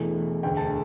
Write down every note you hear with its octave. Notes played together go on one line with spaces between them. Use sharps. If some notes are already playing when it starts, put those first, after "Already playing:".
Already playing: E1 E2 E3 A3
E1 D2 D3 G5
A5